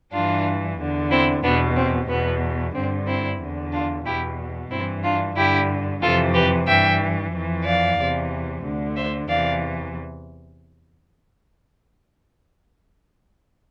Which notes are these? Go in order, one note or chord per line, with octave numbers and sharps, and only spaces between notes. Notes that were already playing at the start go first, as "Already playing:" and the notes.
G2 E3 D4 F4
E2 D3
C4 E4
E2 B2 B3 D4
C4
E2 B2 B3
G2 D3 C4
C4 E4
E2 D3
D4 F4
E2 B2 E4 G4
G2 E3 C4 E4
D4 F4
G2 D3 E4 G4
F2 C3 E3 F4 A4
G4 B4
G2 E3 E5 G5
F2 E3
D5 F5
E2 C3 E3
D2 D3
C5 E5
E2 C3 E3 D5 F5